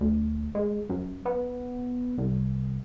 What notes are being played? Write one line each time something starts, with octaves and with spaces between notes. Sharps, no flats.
D2
G#3
F#2
B3
C2